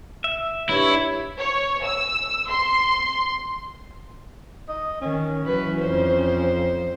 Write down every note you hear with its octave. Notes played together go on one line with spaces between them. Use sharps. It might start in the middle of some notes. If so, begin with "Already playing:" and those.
E5
G2 E4 C#5
C#5
E6
C6
D#5
D#3 C#4
E3 F#3 B4
F2 C5